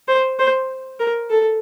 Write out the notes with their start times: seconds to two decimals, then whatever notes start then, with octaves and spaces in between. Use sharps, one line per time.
0.08 C5
0.39 C5
1.00 A#4
1.30 A4